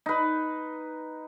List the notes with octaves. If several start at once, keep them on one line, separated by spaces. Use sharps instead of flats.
D#4 B4